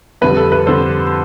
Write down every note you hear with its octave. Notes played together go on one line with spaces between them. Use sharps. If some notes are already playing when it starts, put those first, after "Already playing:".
F2 D3 G3 B4
A4
B4
F2 D3 G3 A4 C5